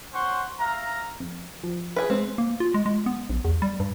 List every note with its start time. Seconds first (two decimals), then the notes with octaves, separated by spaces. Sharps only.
0.12 C#4 C5 F#5 C6 C#6
0.59 E5 F5 A#5
1.20 F2
1.64 F3
1.96 G#4 B4
2.10 G#3 C4
2.38 A#3
2.60 F4
2.74 G#3
2.86 G#3
3.06 B3
3.30 A#1
3.45 E2
3.62 G3
3.80 G2